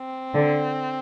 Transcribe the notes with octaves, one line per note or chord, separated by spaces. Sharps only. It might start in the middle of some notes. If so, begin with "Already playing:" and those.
Already playing: C4
D3